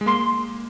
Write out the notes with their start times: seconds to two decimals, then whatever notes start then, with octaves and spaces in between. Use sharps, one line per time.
0.01 G#3
0.06 A#3 C6